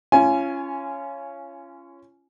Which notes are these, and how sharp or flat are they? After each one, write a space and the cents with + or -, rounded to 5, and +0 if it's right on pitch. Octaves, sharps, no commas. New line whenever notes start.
C#4 +0 F4 -30 G#5 +15